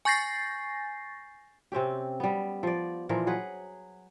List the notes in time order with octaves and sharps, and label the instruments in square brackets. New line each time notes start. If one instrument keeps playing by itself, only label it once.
[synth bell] G#5 C#6 G6 A6 A#6 C7
[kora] C3 C4 C#4 G4
G3 B3
F3 D5
A#2 E3 F3 A#4
F#3 G#4 B4 F#5